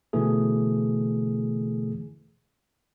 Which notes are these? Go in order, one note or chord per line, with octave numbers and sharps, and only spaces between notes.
B2 D3 E3 A3 G#4